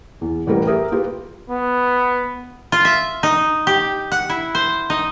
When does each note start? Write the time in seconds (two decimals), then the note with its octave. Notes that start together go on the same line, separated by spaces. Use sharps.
0.21 E2
0.47 A1 G3 A3 A#4 B4
0.67 G4 A#4 E5 D#6
0.92 F4 G4 B4
1.50 B3
2.72 F4
2.85 E5
3.23 D#4
3.67 G4
4.12 F#5
4.30 E4
4.55 C5
4.90 D#4